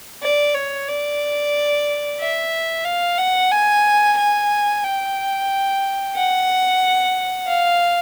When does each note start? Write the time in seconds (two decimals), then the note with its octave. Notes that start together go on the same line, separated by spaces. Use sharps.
0.22 D5
0.54 C#5
0.88 D5
2.19 E5
2.85 F5
3.18 F#5
3.51 G#5
4.17 G#5
4.84 G5
6.15 F#5
7.47 F5